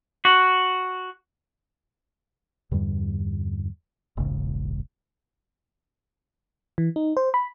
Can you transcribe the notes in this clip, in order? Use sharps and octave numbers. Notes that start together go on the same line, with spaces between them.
F#4
E2 G2 D3 G3
E1 A#1 G#2 C#3
E3
D#4
C5
B5